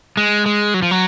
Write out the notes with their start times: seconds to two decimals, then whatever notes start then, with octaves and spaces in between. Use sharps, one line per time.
0.17 G#3
0.46 G#3
0.74 F#3
0.82 F3
0.91 F#3